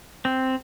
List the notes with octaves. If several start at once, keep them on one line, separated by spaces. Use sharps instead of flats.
C4